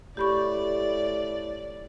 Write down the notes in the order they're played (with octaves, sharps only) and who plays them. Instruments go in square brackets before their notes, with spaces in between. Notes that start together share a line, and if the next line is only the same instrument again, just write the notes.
[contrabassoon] A2 [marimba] G4 B5 C#6 [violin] D5